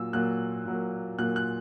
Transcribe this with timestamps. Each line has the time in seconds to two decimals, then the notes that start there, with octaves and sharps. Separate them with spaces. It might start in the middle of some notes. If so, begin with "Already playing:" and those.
Already playing: A#2 F#3 A#3 E6
0.13 A#2 F#3 A#3 F#6
0.66 A#2 F#3 A#3
1.19 A#2 F#3 A#3 F#6
1.36 F#6